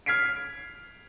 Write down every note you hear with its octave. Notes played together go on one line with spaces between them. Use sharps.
F6 G#6 B6 C7 D7